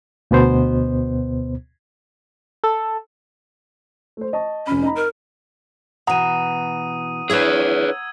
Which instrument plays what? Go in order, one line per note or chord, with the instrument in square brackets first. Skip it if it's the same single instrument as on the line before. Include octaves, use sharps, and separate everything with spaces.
[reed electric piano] D2 B2 B3 C5
[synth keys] A4
[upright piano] A3 C5
D#5 A5 C#6
[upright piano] F1 B5 [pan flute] C#4
[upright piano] D#4 A#5 B5
[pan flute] A#4
[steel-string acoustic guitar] B2 E3 [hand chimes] F#5 A#5 [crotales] D#6 D#7
[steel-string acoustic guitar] D4 E4 C#5 [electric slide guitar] G#4 B4 [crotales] E6 G#6